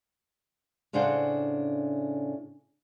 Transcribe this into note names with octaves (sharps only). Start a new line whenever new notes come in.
A2 C#3 D4 C5 F#5